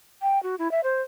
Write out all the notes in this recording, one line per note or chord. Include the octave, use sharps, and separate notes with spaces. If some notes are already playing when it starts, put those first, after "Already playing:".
G5
F#4
E4
E5
C5